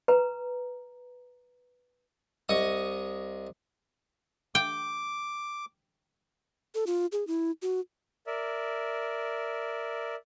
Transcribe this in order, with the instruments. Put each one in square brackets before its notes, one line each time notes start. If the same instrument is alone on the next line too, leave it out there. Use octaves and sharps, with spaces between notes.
[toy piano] B4 A#5
[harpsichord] C2 D#5 C#6 D#6
[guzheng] G5 [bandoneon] D6
[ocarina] A4
F4
G#4
E4
F#4
[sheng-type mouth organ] A#4 D5 E5